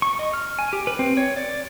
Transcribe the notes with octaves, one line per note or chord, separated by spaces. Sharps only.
C#6
D#5
F6
G#5
G4
B4
C4
C#5
D5